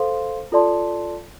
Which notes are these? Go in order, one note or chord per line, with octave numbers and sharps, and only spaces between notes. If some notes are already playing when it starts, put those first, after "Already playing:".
Already playing: A4 C5 F5 C6
F4 A4 D5 A5 C6